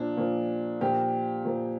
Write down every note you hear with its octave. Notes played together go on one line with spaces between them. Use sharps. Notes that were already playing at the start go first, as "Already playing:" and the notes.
Already playing: A#2 F3 D4
A#2 F3
A#2 F3 G4
A#2 F3